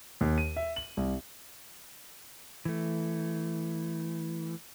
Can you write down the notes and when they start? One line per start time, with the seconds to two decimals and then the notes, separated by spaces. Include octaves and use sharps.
0.21 D#2
0.38 D#7
0.56 E5
0.76 F#7
0.97 C2
2.65 E3 A3